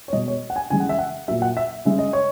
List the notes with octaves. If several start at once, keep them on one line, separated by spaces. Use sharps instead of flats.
C#5
B2 G#3 D#5
C#5
F#5
G#5
C#3 E3 G#3 G#5
F#5
E5
F#5
A#2 F#3 E5
F#5
E5
C#3 G#3 E5
D#5
C#5